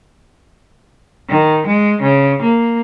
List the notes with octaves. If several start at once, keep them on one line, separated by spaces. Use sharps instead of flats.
D#3
G#3
C#3
A#3